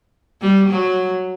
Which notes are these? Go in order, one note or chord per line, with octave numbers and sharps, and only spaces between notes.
G3
F#3